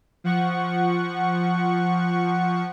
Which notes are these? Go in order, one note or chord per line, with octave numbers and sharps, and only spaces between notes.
F3 F#5 C#6